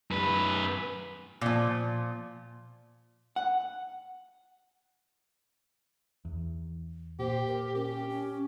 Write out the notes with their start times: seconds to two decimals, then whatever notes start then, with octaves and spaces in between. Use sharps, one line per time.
0.11 F#2 B4
1.41 A#2 F3
3.36 F#5
6.25 E2
7.19 A#2 G4 C5
7.47 A#4
7.75 C#4 G4
8.09 C#4